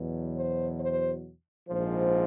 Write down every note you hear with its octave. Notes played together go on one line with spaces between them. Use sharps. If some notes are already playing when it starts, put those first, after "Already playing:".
Already playing: E2 B2 F#3
C5
C5
A#1 G#2 F3 C5